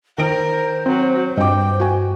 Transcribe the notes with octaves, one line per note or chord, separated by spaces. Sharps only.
D#3 A#4 C5 D7
F#3 C4
G2 D#5 G5 D6
F#4 G#5